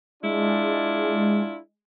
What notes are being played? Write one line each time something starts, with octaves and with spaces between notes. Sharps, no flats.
G#3 D4 E4 F4